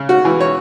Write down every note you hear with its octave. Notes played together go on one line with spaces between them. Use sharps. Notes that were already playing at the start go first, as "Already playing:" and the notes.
Already playing: C#3
F#4
E3
C#5